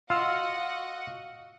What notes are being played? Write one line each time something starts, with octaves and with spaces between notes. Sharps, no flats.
F4 F#4 D#5 F5 F#5 E6 F6